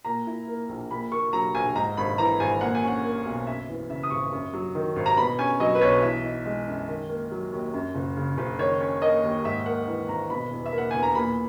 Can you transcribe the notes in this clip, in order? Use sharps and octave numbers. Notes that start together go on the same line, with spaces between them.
A#2 A#5
E4
A#3
A#1
A#2 B5
A#3 C#6
F#3 A#5
A#1 G#5
G#2 A#5
G#1 B5
E3 A#5
G#1 G#5
A#2 F#5
G#5
C#4 F#5
A#3
B1
F#2 E5
E3
C#3 E5
D#6
G#1 C#6
F#2
F#3
D#3
G#1
A#5
B2 B5
C#4 G#5
F#3 D#5
B4
B1 C#5
E3 E5
D#4
G#3
F#2
D#3
A#3
F#3
D#2
F#2
F#1
C#3
F#1
D#3 C#5
C#4
A#3 D#5
D#2
G#2 E5
A#3 F#5
E3
G#1 A#5
B2 B5
E2
E5
A#3
F#5
E2 G#5
A#5
A#2 B5